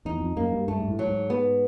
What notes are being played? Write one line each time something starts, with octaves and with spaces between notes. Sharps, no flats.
E2 D#4
F2
F#2 A#3
G2
G2 A3
G#2
A2
F#3
G#2
B3